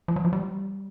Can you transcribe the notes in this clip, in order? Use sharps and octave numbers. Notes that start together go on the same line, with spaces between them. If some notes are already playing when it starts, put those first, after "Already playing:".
F3
F#3
F3
G3